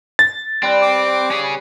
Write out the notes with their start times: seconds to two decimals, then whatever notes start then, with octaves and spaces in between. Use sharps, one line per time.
0.19 A6
0.63 G3 C4 B4
0.82 D6
1.31 C#4 G#4